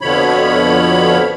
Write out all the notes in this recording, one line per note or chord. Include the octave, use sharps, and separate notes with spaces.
F2 B2 D3 F3 C#5 B5